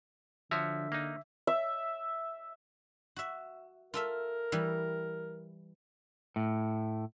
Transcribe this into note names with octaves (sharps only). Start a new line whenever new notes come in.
D3 F3 F#4 C#5 E5
A#3 D#4
E5
F#4 E5
F4 A4 A#4 E5
E3 G3
A2